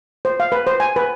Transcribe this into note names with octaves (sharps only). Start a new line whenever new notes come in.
C5
F5
B4
C5
G#5
B4